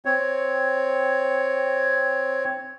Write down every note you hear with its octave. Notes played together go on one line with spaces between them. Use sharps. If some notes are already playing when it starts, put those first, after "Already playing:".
C4 C#5